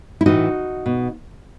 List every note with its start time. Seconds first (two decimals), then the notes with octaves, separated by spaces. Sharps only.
0.21 E4
0.26 A2 E3 D#4 F#4
0.86 B2